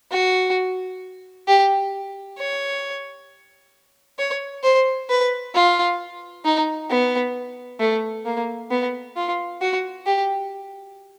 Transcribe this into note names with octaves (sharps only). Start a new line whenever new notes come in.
F#4
G4
C#5
C#5
C5
B4
F4
D#4
B3
A3
A#3
B3
F4
F#4
G4